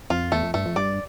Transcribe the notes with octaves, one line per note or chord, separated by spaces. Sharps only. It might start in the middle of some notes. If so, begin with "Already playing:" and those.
F2 F4
E2 A3
F2
G2 A3
F2
G2 D5